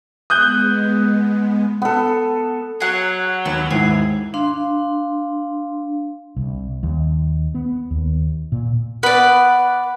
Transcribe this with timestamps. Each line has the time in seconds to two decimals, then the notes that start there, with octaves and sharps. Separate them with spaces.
0.30 G#3 B3 D#6 F#6 G6
1.82 B3 A4
2.80 F#3 G#4 F#5
3.45 D#2 B3 E4
3.70 D#2 G#2 E4 G#4
4.34 D4 F5 C6
6.36 C2
6.83 D#2
7.55 B3
7.91 D#2
8.52 A#2
9.03 B3 B4 D5